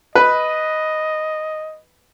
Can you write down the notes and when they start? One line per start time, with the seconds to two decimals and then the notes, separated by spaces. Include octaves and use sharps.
0.15 B4 D#5